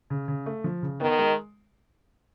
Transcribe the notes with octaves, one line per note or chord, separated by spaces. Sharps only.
C#3
C#3
A3
F3
C#3
D#3 B3
G#3